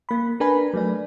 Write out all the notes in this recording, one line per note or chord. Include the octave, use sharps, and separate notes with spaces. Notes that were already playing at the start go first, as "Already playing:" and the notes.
A#3 B5
D4 A#4 B4 G#5 B5
F#3 A3 D5